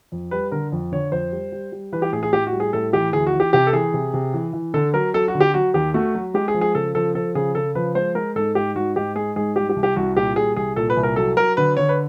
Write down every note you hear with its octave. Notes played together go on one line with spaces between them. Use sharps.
F2
G3 B4
D3 A#4
F2
D3 C#5
F2 C5
G3
G3
G3
E3 B4
G4
A2 G#4
G#4
A2 G4
F#4
G3
G#4
A2 A4
E3 G4
D2 G#4
F#4
E3
G4
C3 G4
A4
E3 G#4
C3
C3
E3
E3
D3 A4
F#3 A#4
F#3 A4
F#4
D3
G4
F#3 F#4
D#2 G4
A3 F#4
F#3
G#3 G4
G#4
F3
G#4
C#3 A4
F3 A4
F3 A4
C#3 G#4
C#3 A4
F3 B4
G#3 C5
G#3 A#4
G#2 A4
G#2 G4
G#2 F#4
G#2 G4
G#3 G#4
G#2 G#4
G3 G4
G4
C2
G4
C2 F#4
A#2 G4
G3 G#4
C2 G#4
A#2 A4
B4
C2
A#4
F#3 A4
F#3 A#4
D3 B4
D3 C#5
B4